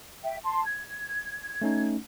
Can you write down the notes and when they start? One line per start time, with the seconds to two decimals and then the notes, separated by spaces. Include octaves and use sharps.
0.23 E5 G5
0.44 A5 C6
0.64 G#6
1.62 A3 C#4 D#4